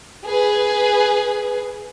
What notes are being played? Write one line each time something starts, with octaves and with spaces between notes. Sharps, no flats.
G#4 B4